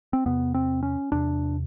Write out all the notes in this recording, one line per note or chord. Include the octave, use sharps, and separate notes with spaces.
C4
E2 C3 B3
C4
C#4
E2 C3 D4